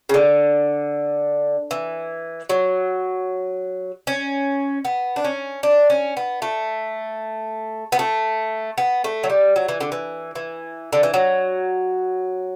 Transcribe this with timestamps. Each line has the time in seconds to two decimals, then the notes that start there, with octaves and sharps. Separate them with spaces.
0.09 C#3
0.14 D3
1.71 E3
2.49 F#3
4.07 C#4
4.85 B3
5.16 D4
5.24 C#4
5.63 D4
5.90 C#4
6.17 B3
6.42 A3
7.92 B3
7.99 A3
8.78 B3
9.04 A3
9.24 F#3
9.30 G3
9.56 F#3
9.68 E3
9.80 D3
9.92 E3
10.35 E3
10.93 D3
11.03 E3
11.14 F#3